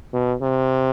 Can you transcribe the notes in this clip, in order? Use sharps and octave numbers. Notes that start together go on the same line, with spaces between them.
B2
C3